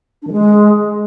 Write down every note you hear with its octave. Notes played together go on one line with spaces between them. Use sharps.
D4
D#3
G#3